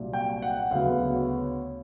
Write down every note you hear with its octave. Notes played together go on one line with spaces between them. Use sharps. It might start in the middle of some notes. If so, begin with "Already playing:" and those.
Already playing: C2 A#2 F#3
G5
F#5
D2 C#3 F#3 B3 F5
C#5